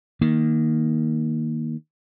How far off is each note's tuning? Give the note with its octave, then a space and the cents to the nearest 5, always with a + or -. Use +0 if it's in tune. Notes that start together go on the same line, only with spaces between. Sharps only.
D#3 +0 A#3 +0